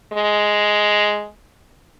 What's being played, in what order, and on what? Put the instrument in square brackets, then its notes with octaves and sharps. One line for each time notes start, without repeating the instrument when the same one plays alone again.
[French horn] G#3